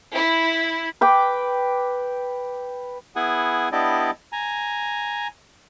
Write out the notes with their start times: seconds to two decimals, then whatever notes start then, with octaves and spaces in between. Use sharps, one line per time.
0.15 E4
1.01 B4 G5 D6
3.16 B3 E4 G#4 F#5 G#5
3.72 B3 D4 E4 G4 D5 D#5
4.32 G#5 A#5